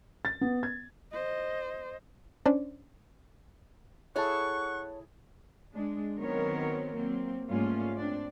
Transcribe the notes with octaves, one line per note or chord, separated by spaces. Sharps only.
A6
B3
G#6
C5 D#5
C#4 D4 C5 D5
E4 G#4 A4 C#5 F#5 A5 C#6
G#3 D4
D#3 F#3 B3 C4 A#4 C#5
F#3 A#3 C4
G#2 G3 A3 A#3 C#4 F4
C4 D4 D5